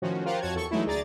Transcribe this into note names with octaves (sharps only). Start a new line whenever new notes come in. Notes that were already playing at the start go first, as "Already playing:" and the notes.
A2 D#3 F3 C#4 F#4
F4 G4 A#4 C5 F5 F#5
F2 F#4 C#5 A5 G#6
E2 A4 C#6
E3 F#3 G#3 A3 D#4 E4
D2 G#4 D5 A#5 A6